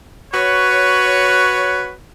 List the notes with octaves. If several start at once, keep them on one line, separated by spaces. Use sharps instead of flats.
F#4 B4 C#5